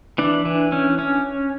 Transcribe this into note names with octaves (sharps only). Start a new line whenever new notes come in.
E3 D4
E3
C#4
C#4